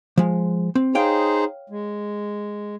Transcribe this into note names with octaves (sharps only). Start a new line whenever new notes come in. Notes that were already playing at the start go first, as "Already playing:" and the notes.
F3 G#3
C4
D#4 G#4 C5 C#5 F5 G5
G#3